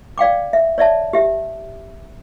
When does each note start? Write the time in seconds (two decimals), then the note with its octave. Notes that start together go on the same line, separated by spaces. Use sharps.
0.18 D5 F5 G5 D6
0.53 E5
0.78 C#5 D5 E5 A5
1.13 G4 E5